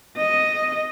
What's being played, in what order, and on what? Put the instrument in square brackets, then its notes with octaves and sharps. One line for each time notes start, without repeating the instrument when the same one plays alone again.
[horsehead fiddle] D#5